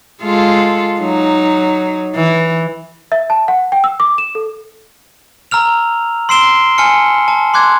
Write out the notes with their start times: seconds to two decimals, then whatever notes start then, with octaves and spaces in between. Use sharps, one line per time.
0.22 G#3 F4 A4
1.00 F#3 D#4
2.15 E3
3.12 E5
3.30 A5
3.48 F#5
3.72 G5
3.84 E6
4.00 D6
4.18 E7
4.35 A4
5.51 A#5 E6 F6 F7
6.29 C6 E6 C7 D7 E7 G7
6.78 G#5 A5 F6 C#7
7.28 A5
7.54 C6 D6 F#6 G#6